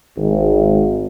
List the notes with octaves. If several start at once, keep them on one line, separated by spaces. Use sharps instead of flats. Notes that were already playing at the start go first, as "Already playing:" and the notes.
G#1